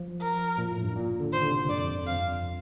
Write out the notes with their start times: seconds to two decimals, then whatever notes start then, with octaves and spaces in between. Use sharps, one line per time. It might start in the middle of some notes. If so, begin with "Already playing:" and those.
Already playing: F3
0.22 A#4
0.58 A#2
0.71 A2
0.83 G2
0.95 A#2
1.20 D3
1.32 D#3 C5
1.41 D3
1.51 C3
1.69 G2 D5
1.79 F2
1.98 F2
2.07 F5